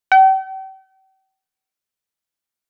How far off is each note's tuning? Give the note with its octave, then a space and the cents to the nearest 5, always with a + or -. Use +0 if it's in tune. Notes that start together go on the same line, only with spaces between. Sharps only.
G5 -40